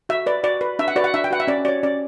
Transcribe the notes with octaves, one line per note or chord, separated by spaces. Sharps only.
F#4 E5
B4 D5
F#4 D5
B4
D4 E5
F#5
F#4 B4 D5
F#5
D4 E5
G5
F#4 B4 F#5
E5
C#4 D5
F#4 C#5 D5
C#4 D5